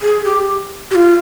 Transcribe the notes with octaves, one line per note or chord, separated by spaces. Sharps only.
G#4
G4
G4
F4